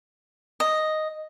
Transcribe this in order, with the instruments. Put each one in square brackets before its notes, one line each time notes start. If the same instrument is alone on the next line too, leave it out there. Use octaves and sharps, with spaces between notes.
[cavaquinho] D#5